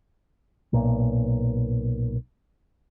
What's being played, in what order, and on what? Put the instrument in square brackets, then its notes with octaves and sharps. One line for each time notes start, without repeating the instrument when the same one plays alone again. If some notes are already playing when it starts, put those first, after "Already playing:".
[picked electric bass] B1 A#2